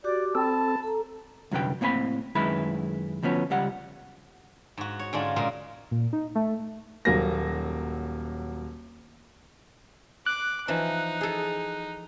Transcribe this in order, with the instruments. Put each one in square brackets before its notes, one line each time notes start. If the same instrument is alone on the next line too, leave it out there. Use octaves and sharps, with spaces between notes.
[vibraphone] F#4 G4 D6 [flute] D5
[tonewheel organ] C4 A4 [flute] A5 [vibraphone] B5
[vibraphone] A4 A#5
[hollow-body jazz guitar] C2 F#2 D3 B4 G5
A2 A#3 C4 G#5 B5
F#2 D#3 G#3 E4 B4 B5
D2 F3 B3 C#4
C#2 G3 F#5
[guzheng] G#2 F#4
C#5
G#2 D3 G#3 C#4 D4 F4
A#2 C#3 G#3 A#4
[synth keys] A#2
D#4
A3
[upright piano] D#1 F#3 A#3 A#6
[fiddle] D6 [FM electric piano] F#6
[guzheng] E3 F3 [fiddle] D#4
[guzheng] G#4 A4